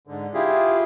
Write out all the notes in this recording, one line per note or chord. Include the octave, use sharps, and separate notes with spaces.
G#2 D3
E4 F4 G4 G#4